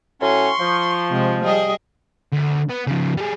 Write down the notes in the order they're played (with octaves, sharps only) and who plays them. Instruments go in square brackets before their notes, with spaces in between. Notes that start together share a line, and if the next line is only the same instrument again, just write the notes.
[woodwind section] A2 F#3 C#4 [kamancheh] C6 C#6
[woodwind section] F3
[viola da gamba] C3 G#3
G3 G#4 D#5
[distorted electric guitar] D2
B3
C#3 F3
G3 G#4